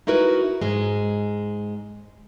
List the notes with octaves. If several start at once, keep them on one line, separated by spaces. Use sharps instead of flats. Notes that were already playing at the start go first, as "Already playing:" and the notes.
D#4 E4 F#4 A#4 B4
G#2 G#3